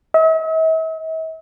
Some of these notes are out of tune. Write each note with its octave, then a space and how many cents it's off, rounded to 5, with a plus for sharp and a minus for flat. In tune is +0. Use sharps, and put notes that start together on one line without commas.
E5 -45